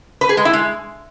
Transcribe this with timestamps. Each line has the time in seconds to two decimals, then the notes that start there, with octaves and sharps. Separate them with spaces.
0.21 B4
0.29 G#4
0.37 G#3
0.45 E4
0.53 G#3